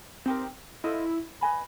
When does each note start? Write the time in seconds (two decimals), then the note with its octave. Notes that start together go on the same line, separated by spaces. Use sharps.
0.26 C4 D#4 G4 A#4
0.84 E4 F4 A4 C5 D#5
1.41 B4 D#5 G#5 B5